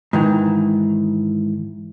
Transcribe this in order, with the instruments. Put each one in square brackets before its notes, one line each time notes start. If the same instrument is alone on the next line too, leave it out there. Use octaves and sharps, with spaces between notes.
[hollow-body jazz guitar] G#2 D#3 E3